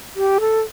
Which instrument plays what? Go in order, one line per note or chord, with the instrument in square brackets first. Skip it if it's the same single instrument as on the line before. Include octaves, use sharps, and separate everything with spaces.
[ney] G4
A4